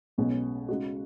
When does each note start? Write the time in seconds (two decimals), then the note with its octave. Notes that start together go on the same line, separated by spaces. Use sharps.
0.18 B1 B2 G#3 C#4
0.69 C#3 G#3 D#4 F#4